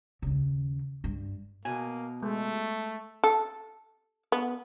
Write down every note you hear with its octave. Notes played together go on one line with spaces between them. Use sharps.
D#2 C#3
G2
B2 A#3 G#5
G#3 A3
A4
B3